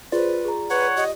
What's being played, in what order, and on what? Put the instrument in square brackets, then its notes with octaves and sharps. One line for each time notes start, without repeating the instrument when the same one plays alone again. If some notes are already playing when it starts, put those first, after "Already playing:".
[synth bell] F4 D5 [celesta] G#4 C5 [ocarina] B4
[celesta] G#4 A#5
[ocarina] B4 [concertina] C#5 F#5
[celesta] G4 [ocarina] D#5